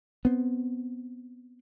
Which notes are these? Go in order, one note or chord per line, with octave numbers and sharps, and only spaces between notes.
B3 C4